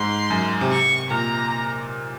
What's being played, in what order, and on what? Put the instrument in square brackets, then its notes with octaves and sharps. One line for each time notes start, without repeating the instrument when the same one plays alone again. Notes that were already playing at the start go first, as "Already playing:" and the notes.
Already playing: [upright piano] G#2 [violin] C6
[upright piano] F#2
C3
[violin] C#6
[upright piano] A#2 [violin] A#5